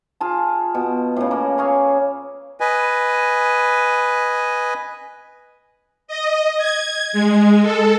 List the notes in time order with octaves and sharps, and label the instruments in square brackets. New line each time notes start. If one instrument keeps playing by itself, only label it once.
[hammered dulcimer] F4 G#4 A5
B2
A2 C#3
A#3
G#4 C#5 F5
[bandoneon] B4 D#5 G#5
[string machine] D#5
G#6
G#3
A4